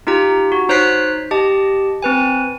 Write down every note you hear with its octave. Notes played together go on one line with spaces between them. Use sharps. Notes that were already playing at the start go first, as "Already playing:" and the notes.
D#4 F4 G4 A#5
F#4
D#4 C5 C#5 F#6 B6 C7
G4 D#5 A5
C4 B4 G#5